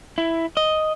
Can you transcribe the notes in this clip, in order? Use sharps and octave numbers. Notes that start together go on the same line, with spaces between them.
E4
D#5